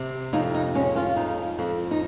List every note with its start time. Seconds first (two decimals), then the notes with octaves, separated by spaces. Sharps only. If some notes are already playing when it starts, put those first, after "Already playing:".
Already playing: C3
0.33 F2 D#4
0.54 D#4
0.75 G#3 C#4
0.95 C#4 F4
1.16 F2 D#4
1.59 F2
1.91 D#4